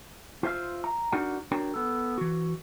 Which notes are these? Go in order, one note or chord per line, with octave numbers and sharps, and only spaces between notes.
F4 C5 E5 F5
A#5
D4 D#4 F#4 A#4 D5 F#5
D4 F#4 A#4 C#5 G5 A#5
B3 A4
E3 F#4